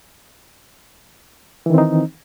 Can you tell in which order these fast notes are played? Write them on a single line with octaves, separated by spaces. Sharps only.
E3 D#3 C4 D#4